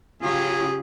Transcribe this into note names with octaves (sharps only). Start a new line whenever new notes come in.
C#3 F#3 F4 G4 G#4